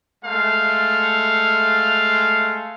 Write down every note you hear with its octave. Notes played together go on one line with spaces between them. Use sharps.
G#3 A3 F5